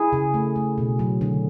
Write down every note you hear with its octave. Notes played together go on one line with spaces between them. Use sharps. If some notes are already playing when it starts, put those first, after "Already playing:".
Already playing: E4 G#4
C#3
A3
A3
B2
F#3
D3